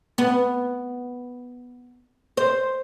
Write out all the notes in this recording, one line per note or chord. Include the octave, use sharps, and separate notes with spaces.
B3
C5